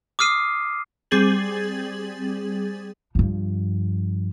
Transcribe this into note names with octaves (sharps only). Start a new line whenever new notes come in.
D6 D#6 F6 C7 D#7
G3 C4 G#4 G#6 A6 F#7
G2 F3